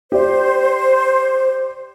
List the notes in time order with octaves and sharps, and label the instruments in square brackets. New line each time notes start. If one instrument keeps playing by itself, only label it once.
[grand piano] G4 D5 [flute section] C5